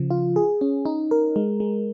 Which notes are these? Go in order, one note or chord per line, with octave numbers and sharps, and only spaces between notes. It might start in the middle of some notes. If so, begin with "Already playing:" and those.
Already playing: C#3 F3
F4
G#4
C#4
D#4
A#4
G#3
G#3